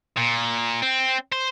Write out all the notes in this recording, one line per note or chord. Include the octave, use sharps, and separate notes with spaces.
A#2
C4
C5